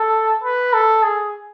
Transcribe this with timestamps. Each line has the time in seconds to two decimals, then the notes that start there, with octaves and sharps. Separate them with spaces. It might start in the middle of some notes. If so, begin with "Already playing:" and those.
Already playing: A4
0.44 B4
0.73 A4
1.03 G#4